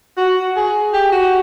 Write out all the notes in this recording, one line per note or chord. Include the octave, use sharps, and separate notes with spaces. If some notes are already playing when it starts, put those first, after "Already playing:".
F#4
G#4
G4
F#4